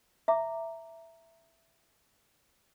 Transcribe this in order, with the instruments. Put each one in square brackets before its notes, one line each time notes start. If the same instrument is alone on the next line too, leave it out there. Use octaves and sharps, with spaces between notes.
[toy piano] E5 A#5 D6